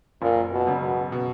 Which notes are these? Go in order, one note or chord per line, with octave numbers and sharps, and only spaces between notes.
F#1 A#2
B2
F#2 C#3
B2
B2